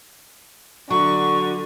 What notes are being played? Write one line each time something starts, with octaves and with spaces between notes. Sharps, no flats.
D3 F#3 C#6